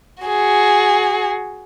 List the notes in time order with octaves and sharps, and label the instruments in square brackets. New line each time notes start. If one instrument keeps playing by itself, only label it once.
[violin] F#4 G#4